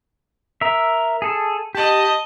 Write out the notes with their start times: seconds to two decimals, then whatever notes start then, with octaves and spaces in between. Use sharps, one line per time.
0.61 A#4 E5
1.22 G#4 A4
1.75 G4 D#5 A5